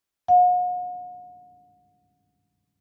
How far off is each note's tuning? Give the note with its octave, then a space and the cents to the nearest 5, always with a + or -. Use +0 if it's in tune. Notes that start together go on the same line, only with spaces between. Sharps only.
F#5 -45